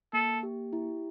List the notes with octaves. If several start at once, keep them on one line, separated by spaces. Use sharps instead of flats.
A#3 A4
G4
E4